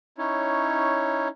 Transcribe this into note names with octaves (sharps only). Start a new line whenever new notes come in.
C#4 D#4 E4 C#5